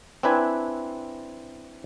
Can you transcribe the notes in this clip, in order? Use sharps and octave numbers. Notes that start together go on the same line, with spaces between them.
C4 D4 E4 B4 G#5